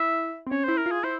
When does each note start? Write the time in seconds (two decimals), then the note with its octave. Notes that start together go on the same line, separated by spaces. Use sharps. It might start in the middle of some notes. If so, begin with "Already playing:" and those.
Already playing: E4 E5
0.47 C4
0.51 C#4 C#5
0.64 E4 C5
0.77 A#4
0.86 F4
0.91 G#4
1.04 E4 C5